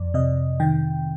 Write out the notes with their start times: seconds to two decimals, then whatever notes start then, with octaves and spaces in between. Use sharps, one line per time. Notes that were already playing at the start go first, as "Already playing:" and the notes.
Already playing: F2 D5
0.14 C3 D#5
0.60 D#3 G5